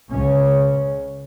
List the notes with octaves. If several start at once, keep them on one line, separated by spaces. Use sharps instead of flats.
C#2 C#3 C#4